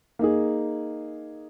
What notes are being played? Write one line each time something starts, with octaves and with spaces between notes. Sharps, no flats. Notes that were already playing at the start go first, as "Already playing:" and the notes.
A#3 D#4 G#4